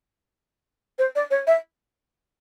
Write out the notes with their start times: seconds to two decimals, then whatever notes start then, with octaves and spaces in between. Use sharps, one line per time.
0.98 C5
1.15 D5
1.30 C#5
1.47 E5